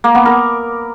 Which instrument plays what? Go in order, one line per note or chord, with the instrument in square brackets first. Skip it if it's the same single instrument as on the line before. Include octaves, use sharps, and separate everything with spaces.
[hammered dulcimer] A#3
B3
A#4